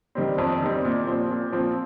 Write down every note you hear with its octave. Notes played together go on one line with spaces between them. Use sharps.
D#3 G3 C4
F2
D#3 G3 C4
A#2
F3 C4
A#2
F3 C4